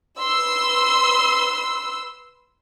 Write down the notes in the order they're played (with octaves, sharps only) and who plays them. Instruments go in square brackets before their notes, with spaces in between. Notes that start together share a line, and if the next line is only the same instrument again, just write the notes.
[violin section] B4 C6 E6